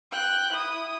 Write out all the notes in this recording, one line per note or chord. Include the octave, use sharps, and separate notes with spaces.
G5 F#6
E4 D#6